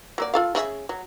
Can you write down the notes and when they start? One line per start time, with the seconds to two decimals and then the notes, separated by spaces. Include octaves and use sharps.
0.18 F#3 A#3 D5
0.34 F4 A4 F5
0.55 C#3 G#4 E5
0.89 F#3